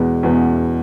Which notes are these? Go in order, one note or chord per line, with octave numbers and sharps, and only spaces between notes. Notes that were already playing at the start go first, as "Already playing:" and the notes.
Already playing: E2 B2 G#3 B3
E2 B2 G#3 B3